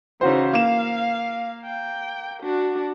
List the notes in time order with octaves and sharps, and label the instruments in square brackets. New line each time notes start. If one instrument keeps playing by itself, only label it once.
[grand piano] C#3 F#4 C5 [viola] E3 D#4
[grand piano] A#3 E7 [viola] F5
[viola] G5
D4 F#4